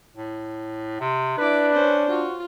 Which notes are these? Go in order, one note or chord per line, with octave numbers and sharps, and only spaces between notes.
A2
C3
D4 E4 B4 D6
C#4 C5
F4 F#4